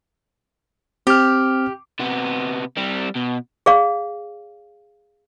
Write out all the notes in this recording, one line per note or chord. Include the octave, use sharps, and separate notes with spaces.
C4 G4 F6
C3 B3
G3 C4
B2
G#4 D5 F5